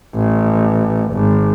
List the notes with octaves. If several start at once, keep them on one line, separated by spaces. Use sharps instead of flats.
A1
G#1